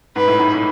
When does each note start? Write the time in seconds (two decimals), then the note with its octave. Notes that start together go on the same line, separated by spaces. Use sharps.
0.16 G#2 B4
0.28 A2
0.39 G#2
0.53 A2